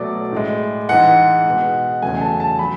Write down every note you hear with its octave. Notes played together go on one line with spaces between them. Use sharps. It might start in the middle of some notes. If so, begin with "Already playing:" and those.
Already playing: B2 F#3 A3 D5
A2 G#3
G#2 E3 G#3 F#5
B2 G#3
E2 C#3 F#3 A3 G#5
A5
A5
F#3 B5